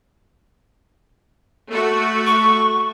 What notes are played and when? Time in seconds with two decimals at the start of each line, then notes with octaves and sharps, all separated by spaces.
1.70 A3 F#4
2.27 C#6